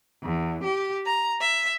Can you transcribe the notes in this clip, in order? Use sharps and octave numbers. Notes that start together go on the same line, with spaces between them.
E2
G4
A#5
E5